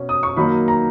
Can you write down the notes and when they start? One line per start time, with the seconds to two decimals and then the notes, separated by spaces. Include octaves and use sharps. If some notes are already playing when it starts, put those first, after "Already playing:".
Already playing: B2 C#4
0.09 D#6
0.23 C#6
0.36 D#3 F#3 A#3 D#4 B5
0.68 A#5